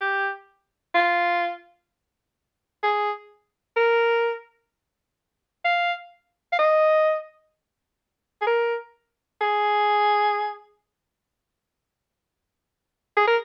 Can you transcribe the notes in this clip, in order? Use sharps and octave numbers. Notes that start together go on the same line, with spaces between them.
G4
F4
G#4
A#4
F5
F5
D#5
G#4
A#4
G#4
G#4
A#4